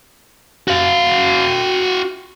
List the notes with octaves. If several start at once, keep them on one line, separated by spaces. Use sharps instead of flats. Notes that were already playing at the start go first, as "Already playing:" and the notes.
F#4 F5